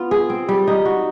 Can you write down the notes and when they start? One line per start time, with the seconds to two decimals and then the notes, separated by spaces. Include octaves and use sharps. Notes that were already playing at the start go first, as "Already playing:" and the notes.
Already playing: B3 D4 F4
0.11 G#4
0.30 C4
0.48 G3
0.68 D#4
0.85 F#4